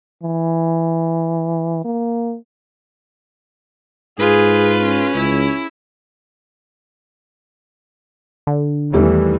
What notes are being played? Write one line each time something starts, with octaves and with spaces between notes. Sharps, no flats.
E3
A#3
G#2 F4 G#4 B4
C#4
C#2 E4
D3
E2 D#3 E3 G3 A3